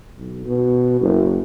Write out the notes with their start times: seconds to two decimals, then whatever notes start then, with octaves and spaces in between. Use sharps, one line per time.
0.16 B1
0.46 B2
1.00 F#1